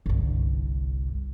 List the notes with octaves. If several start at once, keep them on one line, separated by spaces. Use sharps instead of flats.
G1 C2